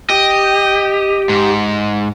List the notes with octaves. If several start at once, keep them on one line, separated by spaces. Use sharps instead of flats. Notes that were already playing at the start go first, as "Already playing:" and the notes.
G4 D#5
G#2